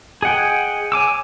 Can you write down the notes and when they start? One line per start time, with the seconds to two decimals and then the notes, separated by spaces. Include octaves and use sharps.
0.22 G#4 D#5 F#5 G5
0.92 C#5 G#5 D6 E6